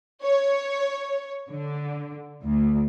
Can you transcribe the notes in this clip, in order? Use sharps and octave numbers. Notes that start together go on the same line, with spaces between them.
C#5
D3
D2